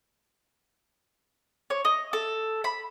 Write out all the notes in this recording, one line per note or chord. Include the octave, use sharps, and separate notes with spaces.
C#5
D#5
A4
B5